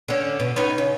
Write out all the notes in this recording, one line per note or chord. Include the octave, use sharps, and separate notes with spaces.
D3 C#4
B2
B3 C#4 D#4
C#3